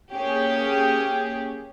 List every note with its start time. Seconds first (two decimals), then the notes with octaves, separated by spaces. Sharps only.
0.13 A#3 C#4 G4 G#4